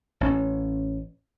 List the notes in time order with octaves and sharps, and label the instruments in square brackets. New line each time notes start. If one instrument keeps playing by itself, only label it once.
[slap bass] A1 C#4